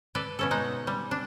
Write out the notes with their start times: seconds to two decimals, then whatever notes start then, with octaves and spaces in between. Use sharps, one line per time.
0.15 A4 B4 D5
0.39 B2 C#4 A4
0.51 G#3 D#4 F#5
0.87 G3
1.11 D4